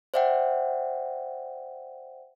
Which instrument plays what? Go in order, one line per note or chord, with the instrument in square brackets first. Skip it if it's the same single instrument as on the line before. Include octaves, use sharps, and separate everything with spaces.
[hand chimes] C5 D5 E5 F#5 G5